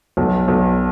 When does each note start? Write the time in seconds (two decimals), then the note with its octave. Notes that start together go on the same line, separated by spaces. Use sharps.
0.17 B1
0.48 B1